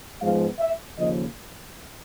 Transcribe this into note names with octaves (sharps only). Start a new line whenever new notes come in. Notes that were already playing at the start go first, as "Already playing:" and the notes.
G#2 F3 G#3 B3 F5
E5
D#2 C#3 F3 A#3 D#5